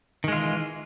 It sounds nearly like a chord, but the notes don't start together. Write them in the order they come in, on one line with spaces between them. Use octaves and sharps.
D#3 G#3 F4 E3